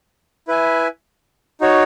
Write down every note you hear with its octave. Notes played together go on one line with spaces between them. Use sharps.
E4 B4 E5 G#5
D#4 F#4 C#5